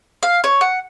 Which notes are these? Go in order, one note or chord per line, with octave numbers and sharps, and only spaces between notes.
F5
C#5
F#5